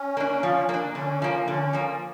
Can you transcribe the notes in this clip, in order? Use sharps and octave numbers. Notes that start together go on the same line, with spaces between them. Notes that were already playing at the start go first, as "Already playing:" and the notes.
Already playing: C#4
A#3 D4
F3
A#3
D4
D3 C#4
F3 A#3
D3 C#4
F3 A#3